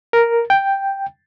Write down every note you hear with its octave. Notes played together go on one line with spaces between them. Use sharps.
A#4
G5